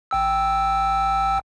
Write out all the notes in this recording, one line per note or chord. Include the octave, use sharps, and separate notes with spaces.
A1 G5 E6